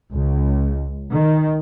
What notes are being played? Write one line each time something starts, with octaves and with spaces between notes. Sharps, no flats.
C#2
D#3